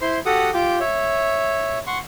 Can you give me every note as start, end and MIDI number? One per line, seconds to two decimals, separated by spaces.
0.01 0.19 64
0.01 0.19 72
0.01 0.19 84
0.26 0.50 66
0.26 0.50 67
0.26 0.50 69
0.26 0.50 78
0.26 0.50 87
0.54 0.79 65
0.54 0.79 67
0.54 0.79 79
0.54 0.79 86
0.80 1.79 73
0.80 1.79 76
1.87 1.99 78
1.87 1.99 84
1.87 1.99 85